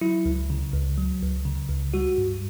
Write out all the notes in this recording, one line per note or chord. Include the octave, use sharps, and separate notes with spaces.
F#3 E4
C#2
C#3
C#2
F#3
C#2
C#3
C#2
G3 F#4
G2